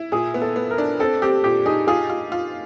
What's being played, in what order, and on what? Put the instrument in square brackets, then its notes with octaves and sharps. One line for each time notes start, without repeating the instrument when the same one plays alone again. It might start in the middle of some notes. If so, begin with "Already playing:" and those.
Already playing: [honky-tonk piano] E4
[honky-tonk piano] A#2 [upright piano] G#4
[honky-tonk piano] B3
[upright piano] A4
[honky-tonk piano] B3
[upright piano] A#4
[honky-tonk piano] D4
[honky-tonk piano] C4 [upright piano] A4
[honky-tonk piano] C4 [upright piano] G4
[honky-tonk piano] A#2 [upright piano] G4
[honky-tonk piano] D#4 [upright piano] G#4
[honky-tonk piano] F4 [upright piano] G#4
[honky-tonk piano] F4
F4